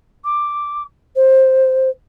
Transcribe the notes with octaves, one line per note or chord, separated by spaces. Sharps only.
D6
C5